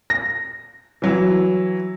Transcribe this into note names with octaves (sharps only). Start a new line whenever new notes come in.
A#6
E3 F#3 E4